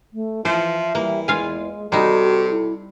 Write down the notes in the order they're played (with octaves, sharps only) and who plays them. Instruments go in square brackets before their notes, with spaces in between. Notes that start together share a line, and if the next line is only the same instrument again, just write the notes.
[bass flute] A3
[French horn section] E3 [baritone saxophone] F3 [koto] C5 [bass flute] E5
[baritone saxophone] E3 [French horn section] G3 [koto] A#3
[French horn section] E2 [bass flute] G#3 [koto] F4 F5 G#5
[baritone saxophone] C3 [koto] G3 D#4 [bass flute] F#4 [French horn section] A4
[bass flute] E4